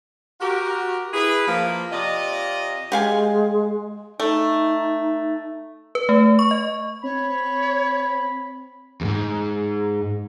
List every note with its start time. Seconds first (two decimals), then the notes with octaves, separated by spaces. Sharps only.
0.41 F#4 G4 A#4
1.13 E4 G#4 B4
1.47 F3 A#3
1.92 C3 F4 D5 D#5
2.92 G#3 G4 F5 G#5
4.20 A3 D#4
5.95 B4
6.09 A3
6.39 C#6
6.51 D#5
7.03 C4 C#5 B5
9.01 E2 G#2